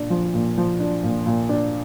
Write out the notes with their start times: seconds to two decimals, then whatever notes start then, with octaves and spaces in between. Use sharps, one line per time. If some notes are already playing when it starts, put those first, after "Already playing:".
Already playing: A#2 D4
0.10 F3
0.34 A#2
0.58 F3
0.80 D4
1.03 A#2
1.26 A#2
1.49 D4